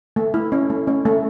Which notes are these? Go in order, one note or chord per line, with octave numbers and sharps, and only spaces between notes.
A3
E4
C#4
A3
C#4
A3